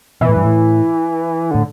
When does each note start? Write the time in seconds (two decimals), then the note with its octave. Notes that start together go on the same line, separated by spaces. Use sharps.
0.21 B2 E3
0.29 A2
0.36 G2
0.44 A2
1.51 A2 D3